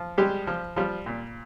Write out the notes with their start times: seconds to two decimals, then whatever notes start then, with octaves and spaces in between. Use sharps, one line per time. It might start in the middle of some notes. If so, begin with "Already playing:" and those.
Already playing: F3
0.18 G3 G#3 G4
0.47 F3
0.76 F3 G3 F4
1.06 A#2